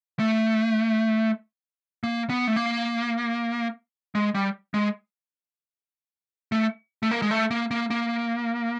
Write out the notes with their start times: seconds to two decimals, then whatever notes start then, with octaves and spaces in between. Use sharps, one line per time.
0.20 A3
2.03 A#3
2.30 B3
2.47 A3
2.56 A#3
4.15 G#3
4.34 G3
4.74 G#3
6.52 A3
7.03 A3
7.11 A#3
7.22 G#3
7.31 A3
7.51 A#3
7.71 A#3
7.90 A#3